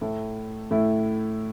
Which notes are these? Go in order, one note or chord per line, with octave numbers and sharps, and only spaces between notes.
A2 A3 E4
A2 A3 E4